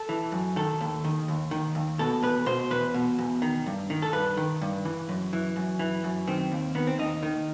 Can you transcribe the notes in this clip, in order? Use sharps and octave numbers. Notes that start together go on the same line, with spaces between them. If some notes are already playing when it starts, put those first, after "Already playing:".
Already playing: A4
E3
F#2
D#3 A4
D#2
D#3
D#2
D#3
D#2
B2 A4
E2 B4
B2 C5
E2 B4
B2
E2
D#3
G2
D#3
A4
G2 B4
D#3
G2
E3
F#2
E3
F#2
E3
F#2
D#3 C4
D#2
D#3 B3
C4
D#2 D#4
D#3